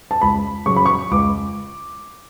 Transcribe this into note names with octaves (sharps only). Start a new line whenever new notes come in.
A5
C#2 B5
C#3 F#3 C#6
B5
C#6
C#2 D6